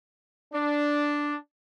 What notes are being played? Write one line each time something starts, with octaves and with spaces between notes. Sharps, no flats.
D4